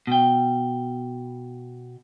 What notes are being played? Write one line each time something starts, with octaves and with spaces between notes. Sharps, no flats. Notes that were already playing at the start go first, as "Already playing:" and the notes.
B2 G5